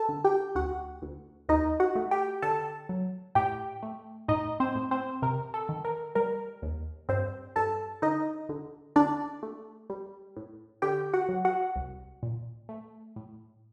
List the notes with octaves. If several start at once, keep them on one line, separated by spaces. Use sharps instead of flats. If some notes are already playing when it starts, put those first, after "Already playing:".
Already playing: A4 A5
D3
G4 G5
D2 F#4 F#5
D2
D#2 D#4 D#5
F#4 F#5
A3
G4 G5
D3 A4 A5
F#3
A2 G4 G5
A3
A2 D#4 D#5
C4 C5
A2
C4 C5
C3 A#4
A4
D#3
A#4
G3 A#4
D#2
G2 C4 C5
G2 A4 A5
D3 D#4 D#5
D3
D3 D4 D5
A3
G3
A2
D3 G4 G5
F#4 F#5
F#3
F#4 F#5
C2
A#2
A3
A2